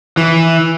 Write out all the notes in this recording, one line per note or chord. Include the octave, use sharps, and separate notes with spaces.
E3